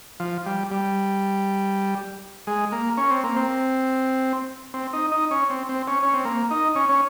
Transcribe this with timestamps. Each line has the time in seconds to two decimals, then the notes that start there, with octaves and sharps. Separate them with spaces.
0.20 F3
0.46 G3
0.71 G3
2.47 G#3
2.72 A#3
2.97 C#4
3.11 C4
3.24 A#3
3.37 C4
4.74 C4
4.93 D#4
5.12 D#4
5.31 C#4
5.50 C4
5.69 C4
5.88 C#4
6.03 C#4
6.14 C4
6.25 A#3
6.51 D#4
6.76 C#4
6.89 C#4